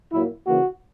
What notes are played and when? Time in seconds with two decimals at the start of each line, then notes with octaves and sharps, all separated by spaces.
0.12 A#2 F#3 A#3 E4
0.47 C#3 E3 A#3 F#4